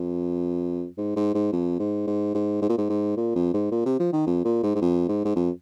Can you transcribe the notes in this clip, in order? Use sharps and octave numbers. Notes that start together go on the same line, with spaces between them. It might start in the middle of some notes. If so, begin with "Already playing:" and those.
Already playing: F2
G#2
G#2
G#2
F2
G#2
G#2
G#2
G#2
A#2
G#2
G#2
A#2
F2
G#2
A#2
C3
F3
D#3
F2
A#2
G#2
G#2
F2
G#2
G#2
F2